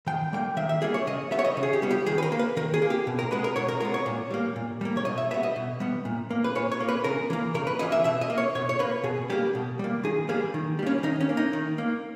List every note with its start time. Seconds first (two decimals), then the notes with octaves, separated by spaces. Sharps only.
0.07 D#3 G5
0.33 G3 A#3 G5
0.57 D#3 E5
0.69 E5
0.82 G3 A#3 G#4
0.94 C#5
1.07 C#3 D#5
1.31 G3 B3 E5
1.39 C#5
1.45 D#5
1.57 C#3
1.63 G#4
1.73 G4
1.82 G3 B3
1.91 G4
2.06 D#3 G#4
2.18 B4
2.23 A#4
2.32 A#3
2.39 B4
2.57 D#3 A#4
2.74 G#4
2.82 A#3
2.90 G4
3.07 B2
3.19 A#4
3.31 G#3 B3 B4
3.44 A#4
3.56 B2 C#5
3.68 A#4
3.80 G#3 B3 A#4
3.94 C#5
4.06 A#2
4.31 G3 A#3
4.56 A#2
4.81 G3 A#3
4.97 C#5
5.05 B2 D#5
5.18 E5
5.31 B3 E5
5.34 G3
5.43 D#5
5.56 B2
5.80 G3 B3
6.05 A#2
6.31 A#3
6.44 B4
6.55 A#2 C#5
6.72 C#5
6.80 A#3
6.89 B4
7.04 C#3 A#4
7.30 E3 A#3
7.54 C#3 A#4
7.67 B4
7.79 E3 A#3 D#5
7.92 E5
8.04 B2 E5
8.21 D#5
8.30 A#3
8.38 C#5
8.55 B2 C#5
8.69 C#5
8.79 A#3 B4
9.04 B2 G#4
9.30 G3 A#3 G4
9.55 B2
9.79 G3 A#3
10.04 D#3 G#4
10.29 G3 A#3 G#4
10.54 D#3
10.79 G3
10.82 A#3 C#4
11.03 D#3 D#4
11.21 C#4
11.29 A#3
11.37 D#4
11.53 D#3
11.78 A#3